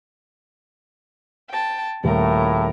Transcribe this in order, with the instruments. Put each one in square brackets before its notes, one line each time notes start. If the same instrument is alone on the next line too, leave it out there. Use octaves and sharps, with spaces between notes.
[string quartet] G5 A5
[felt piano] D#1 [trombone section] A2 C#3 E4 [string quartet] A3 A#4